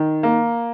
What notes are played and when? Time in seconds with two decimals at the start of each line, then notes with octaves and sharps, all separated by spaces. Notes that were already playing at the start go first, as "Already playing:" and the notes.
Already playing: D#3
0.23 A#3